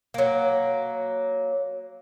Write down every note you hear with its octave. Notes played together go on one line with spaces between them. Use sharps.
F#3 A#3